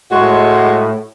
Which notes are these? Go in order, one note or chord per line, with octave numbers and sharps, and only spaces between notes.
A2 G#3 F#4